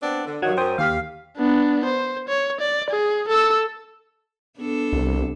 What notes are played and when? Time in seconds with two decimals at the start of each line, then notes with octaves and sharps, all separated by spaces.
0.03 B3 C4 D4
0.25 D3
0.42 G2 D#3 F#3 F#5 G#6
0.57 F#2 C5 G5 D#6
0.78 D#2 G4 F5 B6
1.37 B3 D4
1.85 C5
2.28 C#5
2.60 D5
2.90 G#4
3.28 A4 E6
4.58 B3 D4 A4
4.93 C2